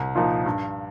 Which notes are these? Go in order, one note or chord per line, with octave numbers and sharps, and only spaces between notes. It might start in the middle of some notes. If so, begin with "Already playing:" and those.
Already playing: C2
A#2 F3 D#4
G2